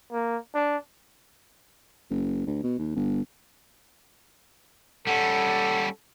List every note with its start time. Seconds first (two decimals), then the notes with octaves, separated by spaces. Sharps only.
0.12 A#3
0.55 D4
2.10 F#1
2.47 D2
2.63 B2
2.79 D#2
2.95 G1
5.07 G3 C#4 A4 F#5